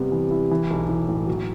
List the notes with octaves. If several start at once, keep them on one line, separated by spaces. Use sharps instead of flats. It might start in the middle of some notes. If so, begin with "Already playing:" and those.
Already playing: C3 G3 B3
E3
E4
E3
B1
E3
A2
F#3